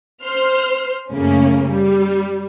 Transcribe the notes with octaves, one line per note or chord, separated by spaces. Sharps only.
C5 C6 F6
F#2 C#3 A3 A#3 C#4
G3